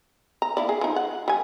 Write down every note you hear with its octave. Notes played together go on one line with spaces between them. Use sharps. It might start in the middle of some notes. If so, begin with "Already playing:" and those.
A#5
A#3 E4 D5
G#4
F3 D#4
F#5
G3 G#5